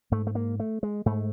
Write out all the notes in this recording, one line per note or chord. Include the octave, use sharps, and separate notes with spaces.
G#2 A3
A3
A#3
A3
G#3
G#2 A3